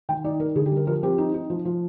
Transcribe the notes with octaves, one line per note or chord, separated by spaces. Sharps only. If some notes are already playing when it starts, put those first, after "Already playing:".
D#3 G5
D#4 D5
D#4 A#4
D3 G#4
G4
G3
A#4
F3 A#4
C4 G4
D#4
D#4
F3
F3